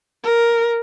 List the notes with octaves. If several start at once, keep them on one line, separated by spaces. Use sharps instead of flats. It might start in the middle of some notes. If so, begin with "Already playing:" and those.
A#4